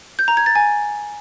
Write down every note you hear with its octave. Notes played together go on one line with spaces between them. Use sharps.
G6
A#5
G#6
A6
G#5